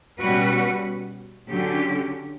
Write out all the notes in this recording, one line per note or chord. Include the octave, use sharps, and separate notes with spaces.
B2 G3 C#4 F#4 B4
D3 F#3 C#4 G4